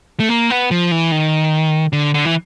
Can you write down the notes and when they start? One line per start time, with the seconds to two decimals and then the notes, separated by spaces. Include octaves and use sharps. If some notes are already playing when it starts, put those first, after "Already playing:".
0.20 A3
0.29 A#3
0.50 B3
0.71 F3
0.91 E3
1.12 D#3
1.93 D3
2.14 D3
2.25 E3